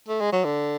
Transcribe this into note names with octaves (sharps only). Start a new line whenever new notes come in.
A3
G#3
F#3
D3